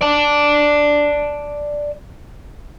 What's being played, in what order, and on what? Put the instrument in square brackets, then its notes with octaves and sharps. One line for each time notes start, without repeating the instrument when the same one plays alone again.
[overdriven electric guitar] D5 A5